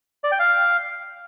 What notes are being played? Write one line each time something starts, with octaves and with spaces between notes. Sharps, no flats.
D5
G5
F5